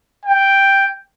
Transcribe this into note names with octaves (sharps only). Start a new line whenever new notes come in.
G5